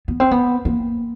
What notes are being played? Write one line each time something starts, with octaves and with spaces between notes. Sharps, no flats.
B3
C4
B3
A#3